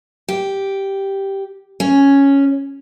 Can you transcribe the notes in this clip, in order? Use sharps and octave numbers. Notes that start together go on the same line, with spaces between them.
G4
C#4